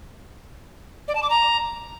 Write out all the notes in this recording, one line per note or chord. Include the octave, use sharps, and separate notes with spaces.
D5
A5
D6
A#5